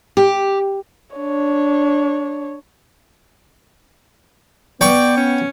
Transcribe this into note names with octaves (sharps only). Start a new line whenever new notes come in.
G4
D4 C#5
B3 D5 G5 C#6
C#4